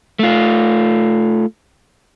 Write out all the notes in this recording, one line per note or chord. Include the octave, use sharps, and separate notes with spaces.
A3 F4